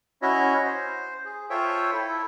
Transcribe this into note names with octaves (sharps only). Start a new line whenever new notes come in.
C#4 E4 F#4 C#5 D#5 E5
C5
G#4
F4 A4 C5 C#5 E5 G5
E4 A4